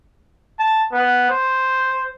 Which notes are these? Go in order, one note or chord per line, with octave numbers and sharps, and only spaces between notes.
A5
B3
C5